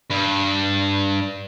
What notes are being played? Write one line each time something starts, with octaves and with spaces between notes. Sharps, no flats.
G2